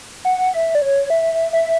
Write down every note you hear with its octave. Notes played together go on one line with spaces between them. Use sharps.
F#5
E5
D5
C#5
E5
E5